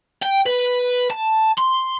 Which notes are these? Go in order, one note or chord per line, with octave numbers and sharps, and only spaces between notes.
G5
B4
A5
C6